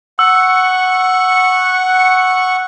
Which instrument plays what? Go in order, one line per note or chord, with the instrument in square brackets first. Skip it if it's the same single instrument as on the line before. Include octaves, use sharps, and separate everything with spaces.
[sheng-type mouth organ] F#5 C#6 [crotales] E6